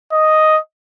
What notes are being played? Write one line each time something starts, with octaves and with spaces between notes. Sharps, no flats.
D#5